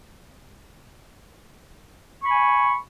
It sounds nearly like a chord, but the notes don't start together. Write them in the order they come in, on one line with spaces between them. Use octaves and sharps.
C#6 B5 G#5